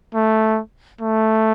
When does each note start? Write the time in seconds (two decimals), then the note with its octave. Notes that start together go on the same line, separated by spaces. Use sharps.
0.15 A3
1.01 A3